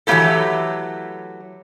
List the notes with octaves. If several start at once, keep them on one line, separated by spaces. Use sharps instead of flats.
E3 F#3 A3 A#3 G4 A4